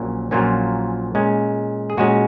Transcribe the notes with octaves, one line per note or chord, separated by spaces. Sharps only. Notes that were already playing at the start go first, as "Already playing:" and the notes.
Already playing: A#1 A#2 F#3 A#3 C#4
A#1 A#2 F#3 A#3 C#4 F4
A#2 G#3 C#4
G#4
A#2 G#3 C#4 F#4